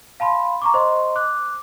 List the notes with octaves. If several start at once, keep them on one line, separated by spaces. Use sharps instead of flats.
F5 A5 B5 C6
A#5 C#6 D6
C5 D#5 C6
D6 F#6